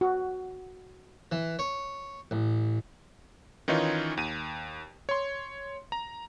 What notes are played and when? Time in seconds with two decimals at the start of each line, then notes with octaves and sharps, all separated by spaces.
0.01 F#4
1.32 E3
1.59 C#5
2.31 A1
3.68 D#3 E3 C#4 D#4 F4 C#5
4.17 D#2 D#7
5.09 C#5 C6
5.92 A#5